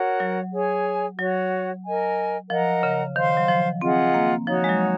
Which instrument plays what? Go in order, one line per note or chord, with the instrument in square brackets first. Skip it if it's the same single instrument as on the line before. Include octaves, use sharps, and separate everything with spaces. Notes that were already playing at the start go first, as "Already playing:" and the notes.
Already playing: [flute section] F#4 A#4 C#5 F#5
[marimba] F#3
[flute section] G#4 C#5 G#5
[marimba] F#3 [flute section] F#4 C#5 F#5
[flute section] A#4 D#5 G#5
[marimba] F3 [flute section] A#4 D#5 F#5 A#5
[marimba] C#3
[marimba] D#3 [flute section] C5 F5 C6
[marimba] F#3
F3
[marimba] C4 [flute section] F4 G#4 D#5 F#5
[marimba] A#3
[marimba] F3 [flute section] D#4 F#4 C#5
[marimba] G#3
F#3